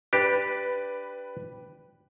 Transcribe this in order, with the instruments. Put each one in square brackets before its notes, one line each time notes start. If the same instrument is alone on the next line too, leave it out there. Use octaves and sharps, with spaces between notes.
[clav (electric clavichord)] D4 G4 [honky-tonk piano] B4